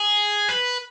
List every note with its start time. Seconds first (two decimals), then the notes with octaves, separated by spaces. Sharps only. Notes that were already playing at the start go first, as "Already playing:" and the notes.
Already playing: G#4
0.49 B4